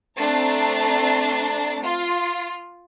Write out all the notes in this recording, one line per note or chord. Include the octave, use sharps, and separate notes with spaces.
A3 C4 D4 A#5 A6 C7
F4